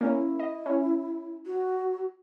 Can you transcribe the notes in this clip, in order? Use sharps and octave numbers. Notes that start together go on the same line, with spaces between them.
A#3 C#4 E4
D#5
C#4
F#4